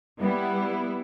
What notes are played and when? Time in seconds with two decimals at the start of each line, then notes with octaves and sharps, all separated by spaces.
0.21 G3 B3 E4